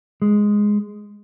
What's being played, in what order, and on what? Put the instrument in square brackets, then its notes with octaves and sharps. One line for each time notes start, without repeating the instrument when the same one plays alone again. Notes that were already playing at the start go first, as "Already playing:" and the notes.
[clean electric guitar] G#3